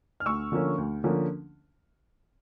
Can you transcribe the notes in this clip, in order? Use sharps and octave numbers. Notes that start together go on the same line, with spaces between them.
F6
D2 C#6 E6
D3 F3 A#3 C#4
D2
D3 F3 A#3 C#4